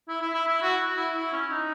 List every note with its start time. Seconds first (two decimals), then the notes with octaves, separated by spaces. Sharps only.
0.08 E4
0.21 E4
0.34 E4
0.48 E4
0.62 F#4
0.97 E4
1.15 E4
1.32 C#4
1.50 D#4